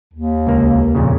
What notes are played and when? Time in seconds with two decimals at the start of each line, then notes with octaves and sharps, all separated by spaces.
0.13 D#2
0.47 C#2 A#3
0.95 F2 A#2 C#3